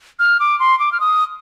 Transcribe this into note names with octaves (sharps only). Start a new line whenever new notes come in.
F6
D6
C6
D6
F6
D#6